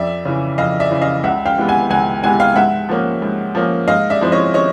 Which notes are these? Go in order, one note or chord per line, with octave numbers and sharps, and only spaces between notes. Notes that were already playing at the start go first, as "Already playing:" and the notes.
Already playing: F2 D5 E5
C#3 E3
F2 D#5 F5
D5 E5
C#3 E3
D#5 F5
C#2 E5 F#5
F5 G5
C3 E3 G#3 B3
F#5 G#5
C#2 F#5 G#5
C3 E3 G#3 B3 F#5 G#5
F5 G5
G#2 E5 F#5
F3 A#3 C#4
G#2
F3 A#3 C#4
G#2 D#5 F5
D5 E5
F3 G#3 C4 E4
C#5 D#5
C#5 D#5